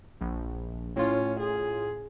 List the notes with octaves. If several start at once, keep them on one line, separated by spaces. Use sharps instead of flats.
A#1
A2 C#4 F4
G#4